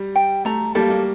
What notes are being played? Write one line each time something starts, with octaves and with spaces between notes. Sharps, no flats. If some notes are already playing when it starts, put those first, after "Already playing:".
Already playing: G3
G5
A3 A#5
G3 A#3 A4
G3 A#3